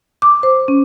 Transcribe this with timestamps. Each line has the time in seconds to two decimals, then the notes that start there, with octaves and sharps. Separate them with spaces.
0.22 D6
0.43 C5
0.68 C#4